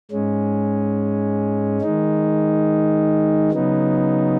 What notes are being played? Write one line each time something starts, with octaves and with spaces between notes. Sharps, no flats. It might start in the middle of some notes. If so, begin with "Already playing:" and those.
G#2 G#3 C#4
D#3 G#3 D#4
C#3 F#3 B3 D#4